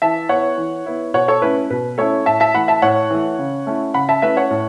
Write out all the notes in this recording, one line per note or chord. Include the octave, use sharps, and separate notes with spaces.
E3 E5 A5
B3 E4 C#5 F#5
E3
B3 E4
B2 C#5 F#5
A4 C#5
A3 C#4 E4 B4
B2 B4
A3 C#4 E4 A4 C#5
A2 E5 A5
E5 A5
E3 A3 F#5 B5
E5 A5
A2 C#5 F#5
E3 A3
C#3
A3 C#4 E4
C#3 F#5 B5
E5 A5
A3 C#4 E4 B4 E5
C#5 F#5
A2